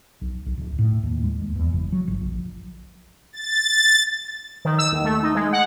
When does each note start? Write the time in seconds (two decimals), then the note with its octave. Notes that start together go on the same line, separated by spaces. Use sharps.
0.21 B1
0.46 B1
0.57 D1
0.79 A2
1.03 D#2
1.24 G#3
1.41 D#2
1.56 E2
1.73 F#1
1.92 F#3
2.08 G1
2.21 A#1
3.33 A6
4.65 D#3
4.78 E6
4.92 D#2
5.04 A3
5.23 D#4
5.35 G#3
5.53 F#5